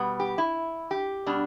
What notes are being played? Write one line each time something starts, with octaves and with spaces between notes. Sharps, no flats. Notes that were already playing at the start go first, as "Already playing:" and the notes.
Already playing: B2 G3 B3
G4
E4
G4
B2 G3 D4